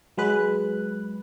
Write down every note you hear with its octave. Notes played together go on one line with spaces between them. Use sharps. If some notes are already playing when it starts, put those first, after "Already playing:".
F#3 G#3 B4 F#6